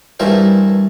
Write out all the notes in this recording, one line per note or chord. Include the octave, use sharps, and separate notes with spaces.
G2 E3 A3 E4 A#4 C5